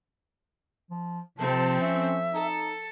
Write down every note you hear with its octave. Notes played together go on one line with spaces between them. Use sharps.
F3
C3 F3 C4 A4 A5
C#4 E5
D#4 A4